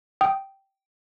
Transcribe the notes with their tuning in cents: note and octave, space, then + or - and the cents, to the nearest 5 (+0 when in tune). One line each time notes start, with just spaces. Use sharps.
G5 -10 D#6 +5